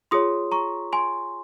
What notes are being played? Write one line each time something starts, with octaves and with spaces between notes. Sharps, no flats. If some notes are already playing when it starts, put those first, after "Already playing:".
F4 G#4 C#5 C6 D#6
A#5 C#6
G#5 C6